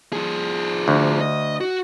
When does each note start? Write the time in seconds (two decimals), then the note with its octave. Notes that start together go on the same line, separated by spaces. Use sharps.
0.13 F3 G#4
0.88 D2
1.21 D#5
1.60 F#4